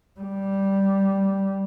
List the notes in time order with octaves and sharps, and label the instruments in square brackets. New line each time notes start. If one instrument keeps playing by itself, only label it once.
[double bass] G3